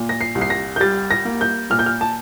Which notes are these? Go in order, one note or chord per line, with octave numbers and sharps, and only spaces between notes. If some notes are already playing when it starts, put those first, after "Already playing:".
Already playing: A#2
A#6
C7
C2
C7
A#6
G6
G3 A6
A#6
A#3
G6
A#2 F6
G6
F6
A5